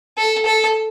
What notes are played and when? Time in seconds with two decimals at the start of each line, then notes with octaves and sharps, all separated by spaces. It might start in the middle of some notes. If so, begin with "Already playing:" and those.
0.17 A4
0.46 A4